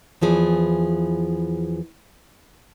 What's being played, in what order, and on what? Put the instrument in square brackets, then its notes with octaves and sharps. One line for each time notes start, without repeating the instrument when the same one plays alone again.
[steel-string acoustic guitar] E2 E3 F3 G#4